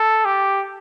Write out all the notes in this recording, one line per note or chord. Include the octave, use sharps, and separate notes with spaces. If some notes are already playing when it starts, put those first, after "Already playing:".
Already playing: A4
G4